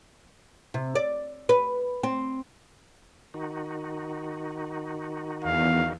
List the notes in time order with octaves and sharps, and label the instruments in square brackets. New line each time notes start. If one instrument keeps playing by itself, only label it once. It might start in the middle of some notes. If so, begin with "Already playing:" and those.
[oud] C3
D5
B4
C4
[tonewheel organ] D#3 D#4 F#4
[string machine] E2 [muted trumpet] F5